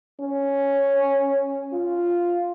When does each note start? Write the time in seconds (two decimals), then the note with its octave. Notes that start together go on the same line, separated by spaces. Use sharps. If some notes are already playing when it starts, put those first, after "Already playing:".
0.20 C#4
1.73 F4